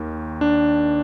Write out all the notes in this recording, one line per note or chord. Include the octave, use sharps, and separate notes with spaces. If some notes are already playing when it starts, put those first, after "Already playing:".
Already playing: D#2 D#3
D4